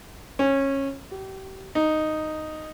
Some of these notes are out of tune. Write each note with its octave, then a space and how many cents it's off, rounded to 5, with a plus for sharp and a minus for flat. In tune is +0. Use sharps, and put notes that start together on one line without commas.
C#4 -20
G4 -35
D#4 -5